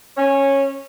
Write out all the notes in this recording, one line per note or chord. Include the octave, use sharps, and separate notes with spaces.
C#4